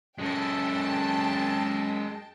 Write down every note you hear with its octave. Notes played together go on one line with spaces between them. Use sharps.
F#2 G#3 A4 G5 A5